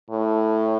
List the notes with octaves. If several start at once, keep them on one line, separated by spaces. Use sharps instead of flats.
A2